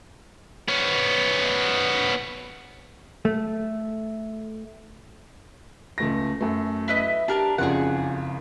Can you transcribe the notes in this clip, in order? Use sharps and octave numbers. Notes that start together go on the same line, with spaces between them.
B3 C#4
A3
C#2 A3 A#6
F#2 A3
E4 B4 D#5
D4 G4 A#4 A5
F#1 F2 C#3 G#4 D5 F#5